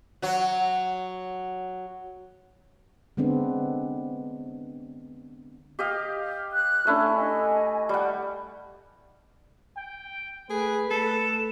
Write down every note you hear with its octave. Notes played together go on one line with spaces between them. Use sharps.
F#3 F#4
D3 G#3 B3 C4 D4
G4 D#5 F5
F#6
A3 C#4 D4 E4
D#5 G#5
G3 F#5
G5
A3 G#4 B4
A3 A4 E7